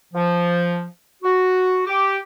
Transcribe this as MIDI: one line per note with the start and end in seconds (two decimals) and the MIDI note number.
0.13 0.84 53
1.23 1.81 66
1.86 2.17 67